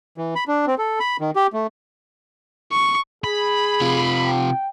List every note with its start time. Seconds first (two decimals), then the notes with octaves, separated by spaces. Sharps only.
0.18 E3
0.35 B5
0.48 D4
0.67 C4
0.78 A4
1.00 B5
1.21 D#3
1.36 G4
1.53 A3
2.72 C#6
3.24 G#4 B5
3.81 C3 F4
4.25 G5